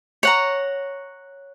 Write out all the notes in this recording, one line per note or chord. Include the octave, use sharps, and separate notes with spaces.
C#5 F#5 A#5